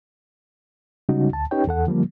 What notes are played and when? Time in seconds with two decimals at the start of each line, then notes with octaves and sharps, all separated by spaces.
1.09 C#3 G3 G#3 C#4 D#4 F#4
1.33 D2 A5
1.51 C#4 D#4 G4 B4 C#5 G5
1.67 E2 A4 F#5
1.87 D3 F3 G3 A#3